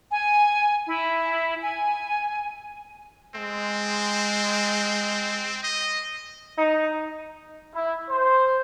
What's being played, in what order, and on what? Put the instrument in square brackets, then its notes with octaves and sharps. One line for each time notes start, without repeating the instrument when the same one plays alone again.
[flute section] G#5
E4
G#5
[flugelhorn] G#3 [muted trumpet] C4
[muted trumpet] D#5
[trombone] D#4
[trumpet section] E4
C5